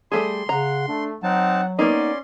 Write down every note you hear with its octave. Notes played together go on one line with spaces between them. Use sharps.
G3 A3 G#4 C6
C#3 F#5 A#5
A3 D4
F#3 C4 D#4 F#5 A5
A#3 B3 C#4 D#4 D5 C6